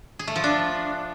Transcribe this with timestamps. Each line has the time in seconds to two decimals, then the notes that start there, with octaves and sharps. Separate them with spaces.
0.19 G#4
0.27 A3
0.36 F3
0.44 D4